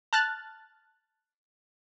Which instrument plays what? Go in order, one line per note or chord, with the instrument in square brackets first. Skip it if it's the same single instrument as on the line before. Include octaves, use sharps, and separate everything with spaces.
[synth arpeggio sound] A5 F6 F#6 A6